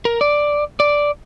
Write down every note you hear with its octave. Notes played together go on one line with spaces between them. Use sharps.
A#4
D5
D5